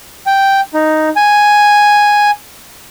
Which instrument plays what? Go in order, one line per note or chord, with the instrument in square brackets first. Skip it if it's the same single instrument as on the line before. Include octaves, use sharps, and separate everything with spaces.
[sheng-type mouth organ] G5
D#4
G#5